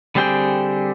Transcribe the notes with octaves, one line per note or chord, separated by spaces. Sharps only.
D3 G3 C4 G#4 G5